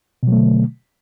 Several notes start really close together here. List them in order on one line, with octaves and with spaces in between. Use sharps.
B2 F#3 A3 D3